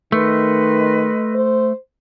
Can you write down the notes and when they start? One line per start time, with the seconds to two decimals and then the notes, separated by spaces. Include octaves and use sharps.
0.12 D#3 A3 B4 D#5 C6
1.35 C5